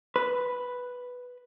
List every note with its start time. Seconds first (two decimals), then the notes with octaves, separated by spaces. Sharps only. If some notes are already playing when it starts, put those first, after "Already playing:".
0.16 B4